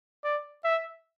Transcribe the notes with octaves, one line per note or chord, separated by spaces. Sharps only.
D5
E5